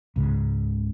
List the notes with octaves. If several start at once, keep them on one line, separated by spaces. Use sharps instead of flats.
C#2 G#2 C#3